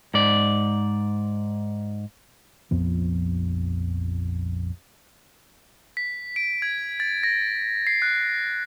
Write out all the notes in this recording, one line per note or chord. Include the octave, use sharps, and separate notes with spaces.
G#2 D5
A#1 F2 F3 B3
B6
D7
G#6
A6
A#6
C7
F#6